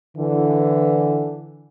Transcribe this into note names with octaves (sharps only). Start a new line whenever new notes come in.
D3 E3